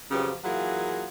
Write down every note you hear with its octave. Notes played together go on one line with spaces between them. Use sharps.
F2 C#3 F3 F#3 G4 B4
E3 F#3 A#3 F4 G#4